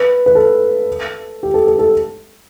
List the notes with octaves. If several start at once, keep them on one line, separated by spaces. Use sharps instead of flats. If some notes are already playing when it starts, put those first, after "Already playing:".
Already playing: B4
B4
A4
G4
A4
A4
A4